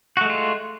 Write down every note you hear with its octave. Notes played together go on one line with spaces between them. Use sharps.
G#3 A3 F4 F#4